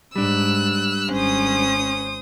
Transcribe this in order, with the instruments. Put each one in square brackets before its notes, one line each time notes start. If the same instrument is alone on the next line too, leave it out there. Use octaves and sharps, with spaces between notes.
[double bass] G#2 [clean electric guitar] G3 D4 [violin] E6 F#6
[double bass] G#1 [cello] C#4 [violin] C5 D#6